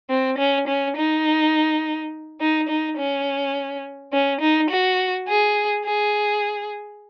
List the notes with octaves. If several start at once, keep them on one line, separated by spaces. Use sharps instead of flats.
C4
C#4
C#4
D#4
D#4
D#4
C#4
C#4
D#4
F#4
G#4
G#4